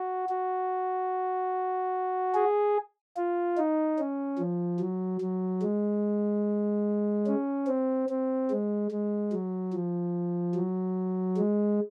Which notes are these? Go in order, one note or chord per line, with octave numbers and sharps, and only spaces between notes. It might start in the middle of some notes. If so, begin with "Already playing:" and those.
Already playing: F#4
F#4
G#4
F4
D#4
C#4
F3
F#3
F#3
G#3
C#4
C4
C4
G#3
G#3
F#3
F3
F#3
G#3